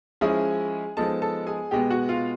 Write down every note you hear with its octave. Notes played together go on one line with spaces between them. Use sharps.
F3 G#3 C#4 E4 G#4 G#5
F3 G#3 B3 D#4 A4 A5
A4 A5
G#4 G#5
B2 G#3 B3 G4 G5
F#4 F#5
F4 F5